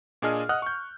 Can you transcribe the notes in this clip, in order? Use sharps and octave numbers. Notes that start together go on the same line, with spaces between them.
A#2 D4 G#4 D#5 F6
D#5 F#5 D#6 F6 F#6
C#6 G6